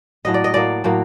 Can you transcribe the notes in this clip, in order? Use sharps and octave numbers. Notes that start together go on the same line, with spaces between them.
A2 F#3 A#3 D#5
D5
D#5
A2 F#3 A#3 D5
A2 F#3 A#3